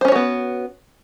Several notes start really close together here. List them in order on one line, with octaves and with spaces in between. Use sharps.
C5 C#4 C#5 F#4 B3